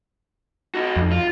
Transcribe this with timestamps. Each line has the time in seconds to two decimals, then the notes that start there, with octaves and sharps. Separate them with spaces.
0.74 D#4 F#4
0.97 F2
1.12 F4